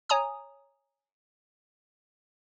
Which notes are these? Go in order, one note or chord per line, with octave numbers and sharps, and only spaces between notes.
C#5 G#5 A#5 D#6